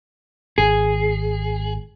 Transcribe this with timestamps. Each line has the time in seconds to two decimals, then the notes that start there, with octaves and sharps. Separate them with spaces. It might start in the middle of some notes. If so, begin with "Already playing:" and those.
0.58 G#1 G#4